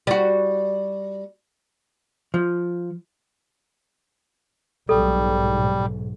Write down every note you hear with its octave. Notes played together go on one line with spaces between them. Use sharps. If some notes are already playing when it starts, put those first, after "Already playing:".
G3 F#4
F3
B1 G#2 G3 A4